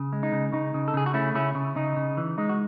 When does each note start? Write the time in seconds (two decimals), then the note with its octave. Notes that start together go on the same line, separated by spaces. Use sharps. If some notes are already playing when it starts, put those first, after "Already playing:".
Already playing: C#3
0.13 G#3
0.23 D#4
0.32 C#3
0.53 C#3 D#4
0.74 C#3
0.88 A4
0.94 C#3 G#4
1.06 F#4
1.14 A3 C#4 E4
1.34 C#3 C#4 E4
1.55 C#3
1.76 C#3 D#4
1.96 C#3
2.17 E3
2.38 G#3 D#4
2.49 F#4